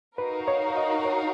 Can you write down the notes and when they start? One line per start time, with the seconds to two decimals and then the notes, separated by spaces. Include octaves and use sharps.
0.18 D#4 F#4 A#4 B4 F5
0.48 C#5
0.77 D#5
1.05 C#5